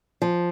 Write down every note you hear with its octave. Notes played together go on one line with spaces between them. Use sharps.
F3